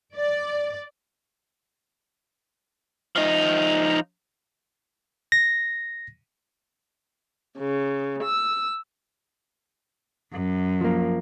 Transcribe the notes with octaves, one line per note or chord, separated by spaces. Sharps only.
D5
F3 D#4
A#6
C#3
E6
F#2
F3 A#3